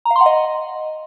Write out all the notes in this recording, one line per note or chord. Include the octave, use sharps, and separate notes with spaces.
A#5
F5
C6
F#5
D#5